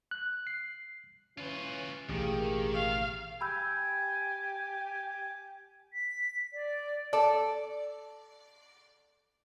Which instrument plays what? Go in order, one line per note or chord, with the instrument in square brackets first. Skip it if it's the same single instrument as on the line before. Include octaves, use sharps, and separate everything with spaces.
[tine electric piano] F#6
C7
[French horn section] E3 C#4 [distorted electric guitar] F4 B4
[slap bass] A1 B2 [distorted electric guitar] D#3 [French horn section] A#3 G4 G#4
[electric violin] F5
[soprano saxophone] G4 [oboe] G#5 [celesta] B5 E6 G6
[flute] B6
D5
[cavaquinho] A4 [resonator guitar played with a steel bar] D5